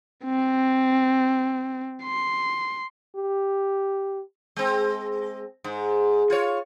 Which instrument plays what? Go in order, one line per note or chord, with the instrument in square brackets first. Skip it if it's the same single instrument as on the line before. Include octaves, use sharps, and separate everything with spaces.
[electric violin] C4
C6
[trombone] G4
[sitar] G#3 C4
G#2
F4 C#5